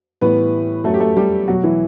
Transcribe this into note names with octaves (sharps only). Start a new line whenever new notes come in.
A2 E3 G3 B3 B4
F#2 F#3 A3 A4
G4
A3 A4
G3 G4
B2 F#3 F#4
E3 E4